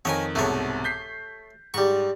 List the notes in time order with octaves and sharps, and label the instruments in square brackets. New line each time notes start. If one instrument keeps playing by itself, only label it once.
[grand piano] F2 D#3 A#4 [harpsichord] C#5 D#5 G#5
[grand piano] C2 G#2 B2 [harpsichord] A3 C#5
[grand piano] G6 B6 C7
[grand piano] G#2 [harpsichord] G3 C#6